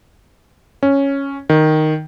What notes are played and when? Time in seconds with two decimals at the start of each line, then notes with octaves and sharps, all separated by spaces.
0.83 C#4
1.49 D#3